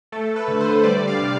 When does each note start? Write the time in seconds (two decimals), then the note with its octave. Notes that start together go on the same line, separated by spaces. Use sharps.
0.12 A3 A4
0.36 B4
0.48 D3
0.60 C5
0.83 G3 D5
1.08 F5
1.19 C3